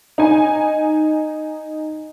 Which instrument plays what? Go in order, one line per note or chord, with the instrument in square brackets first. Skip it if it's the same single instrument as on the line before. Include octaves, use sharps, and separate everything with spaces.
[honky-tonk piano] D#4 G#5